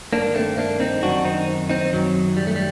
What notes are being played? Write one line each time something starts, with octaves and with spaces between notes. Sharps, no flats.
G2 D#3 A#3 D4
A3 C4
A#3 D4
C4 D#4
F#2 D#3 D4 F#4
C4 D#4
C4 D#4
F#2 D#3 F#3
G3
A3
G3